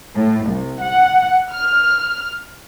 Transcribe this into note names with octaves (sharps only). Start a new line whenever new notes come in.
A2
C2
F#5
F6